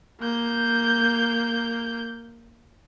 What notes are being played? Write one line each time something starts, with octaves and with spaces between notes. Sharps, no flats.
A#3 G6